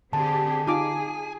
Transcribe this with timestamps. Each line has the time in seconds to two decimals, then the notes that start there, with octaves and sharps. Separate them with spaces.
0.13 D3 C4 G4 G#4 A5
0.67 D#4 F4 G#4 G#5 D6